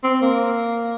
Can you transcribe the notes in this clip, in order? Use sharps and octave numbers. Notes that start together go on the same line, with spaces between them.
C4
A#3